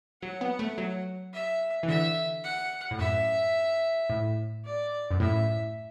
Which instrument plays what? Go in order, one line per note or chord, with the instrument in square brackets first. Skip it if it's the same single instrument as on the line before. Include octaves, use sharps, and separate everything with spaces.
[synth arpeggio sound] F#3 [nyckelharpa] F#5
[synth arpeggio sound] B3
A3
F#3
[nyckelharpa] E5
[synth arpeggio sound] E3
[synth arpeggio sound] D3 [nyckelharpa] E5
[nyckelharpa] F#5
[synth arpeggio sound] A2
[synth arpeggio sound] F#2 [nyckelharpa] E5
[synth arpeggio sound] A2
[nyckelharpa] D5
[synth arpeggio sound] F#2
[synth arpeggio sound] A2 [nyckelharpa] E5